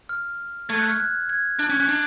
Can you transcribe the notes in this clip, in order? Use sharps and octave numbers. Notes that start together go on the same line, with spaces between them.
F6
A3 G#6
F#6
F6
F#6
G#6
D4 F#6
C#4 G#6
C#4 F#6
D4